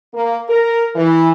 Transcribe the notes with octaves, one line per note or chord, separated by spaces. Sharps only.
A#3
A#4
E3